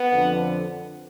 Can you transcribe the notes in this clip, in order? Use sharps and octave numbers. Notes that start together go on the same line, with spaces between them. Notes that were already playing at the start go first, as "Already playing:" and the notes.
Already playing: B3
F2 D3 F3